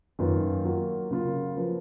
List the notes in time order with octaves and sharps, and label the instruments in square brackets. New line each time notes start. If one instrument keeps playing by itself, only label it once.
[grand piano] F#2 D#3 A#3 F4 B4
F#3 A#3 F4
C#3 F#3 A#3 F4
F3 A#3 F4 B4